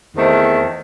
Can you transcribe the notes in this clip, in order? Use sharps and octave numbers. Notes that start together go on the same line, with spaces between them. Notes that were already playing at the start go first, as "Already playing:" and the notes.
E2 D#3 A3 C4